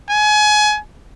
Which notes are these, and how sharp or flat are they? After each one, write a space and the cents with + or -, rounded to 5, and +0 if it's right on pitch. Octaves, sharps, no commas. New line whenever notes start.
G#5 +25